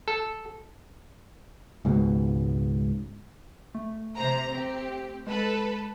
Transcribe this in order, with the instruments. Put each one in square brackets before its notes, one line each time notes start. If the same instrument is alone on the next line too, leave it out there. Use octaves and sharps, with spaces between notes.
[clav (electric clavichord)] A4
[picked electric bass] C#2 G#2 B2
[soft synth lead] A3
[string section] C3 C5 A#5
C4 G4
[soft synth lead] G#3 [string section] A4 B4